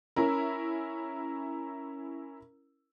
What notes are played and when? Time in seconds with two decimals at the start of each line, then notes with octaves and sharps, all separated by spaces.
0.16 C#4 E4 A#4